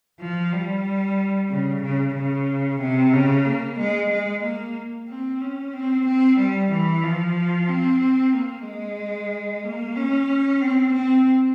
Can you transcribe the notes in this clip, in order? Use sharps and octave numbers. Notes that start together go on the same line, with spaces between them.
F3
G3
C#3
C#3
C#3
C3
C#3
A#3
G#3
G#3
A#3
C4
C#4
C4
C4
G3
E3
F3
C4
A#3
G#3
A#3
C#4
C4
C4